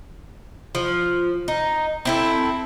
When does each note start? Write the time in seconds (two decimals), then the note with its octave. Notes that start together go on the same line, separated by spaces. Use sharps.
0.75 F3
1.48 D#4
2.05 C4 E4 A4